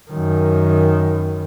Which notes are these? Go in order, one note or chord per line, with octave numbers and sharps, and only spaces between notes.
F#2 D#3